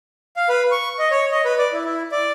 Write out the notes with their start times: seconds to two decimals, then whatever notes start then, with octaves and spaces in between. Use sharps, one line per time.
0.36 F5
0.49 B4
0.72 C#6
0.99 D#5
1.11 C#5
1.31 D#5
1.45 B4
1.58 D5
1.73 E4
1.85 E4
2.12 D5